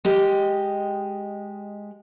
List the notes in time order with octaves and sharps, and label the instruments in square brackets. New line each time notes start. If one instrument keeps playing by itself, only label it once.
[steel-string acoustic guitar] G#3 G4 D#5